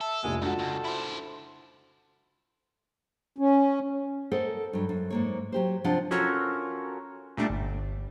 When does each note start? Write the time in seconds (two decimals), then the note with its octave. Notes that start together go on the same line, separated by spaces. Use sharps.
0.01 A4 E5
0.23 F1 A#1 G#3 G#5
0.41 G#2 D4 F4 F#4 A4
0.59 C#2
0.84 E4 C5
3.38 C#4
4.32 A4 A#4 C5 D#5 F#5
4.73 G2 F#3
4.89 F#2
5.10 G#2 A#3 C#5
5.52 F#3 G4 C5
5.84 C3 F3 D4 F4 D#5 F#5
6.11 C#4 F4 F#4 A4 A#4 C#5
7.37 A#2 G3 A3 D4
7.50 G1